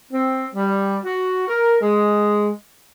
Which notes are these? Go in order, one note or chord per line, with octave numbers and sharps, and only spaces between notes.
C4
G3
F#4
A#4
G#3